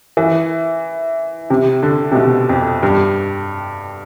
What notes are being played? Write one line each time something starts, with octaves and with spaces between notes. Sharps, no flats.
E3
C3
D3
C3
B2
F2
G2